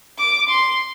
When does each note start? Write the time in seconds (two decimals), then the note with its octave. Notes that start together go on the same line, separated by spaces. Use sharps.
0.19 D6
0.49 C6